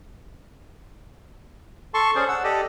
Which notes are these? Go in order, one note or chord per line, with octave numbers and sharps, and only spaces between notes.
A4 A5 C6 C#6
C#4 G#4 C5 D5
F#5 E6
G4 A4 D5 D#5